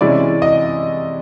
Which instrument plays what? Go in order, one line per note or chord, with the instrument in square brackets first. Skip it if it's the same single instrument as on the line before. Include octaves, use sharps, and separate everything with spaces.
[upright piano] C3 E3 G#3 C#4 E4 D5
D#5